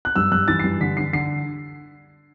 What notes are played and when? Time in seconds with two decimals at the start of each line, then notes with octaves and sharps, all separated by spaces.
0.05 F#6
0.16 G2 E6
0.32 G2 F#6
0.48 E3 A6
0.59 C7
0.64 G2
0.80 D3 B6
0.97 D3 C7
1.13 D3 C7